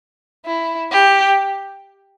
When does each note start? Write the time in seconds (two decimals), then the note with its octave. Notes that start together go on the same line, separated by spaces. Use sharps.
0.46 E4
0.92 G4